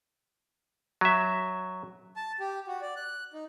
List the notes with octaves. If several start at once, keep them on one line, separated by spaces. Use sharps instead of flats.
F#3 E5
A5
G4
F#4
D5
F#6
D#4